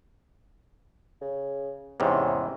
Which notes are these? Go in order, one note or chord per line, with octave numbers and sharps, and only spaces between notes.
C#3
E2 G#2 C3 C#4